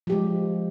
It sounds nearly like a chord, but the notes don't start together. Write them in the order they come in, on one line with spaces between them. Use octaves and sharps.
F3 G4 G#3